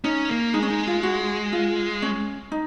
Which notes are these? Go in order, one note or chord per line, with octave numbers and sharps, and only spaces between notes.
C#4 D#4
A#3
G#3 D#4
C#4
D#4
F4
F#4
F4
C#4
D#4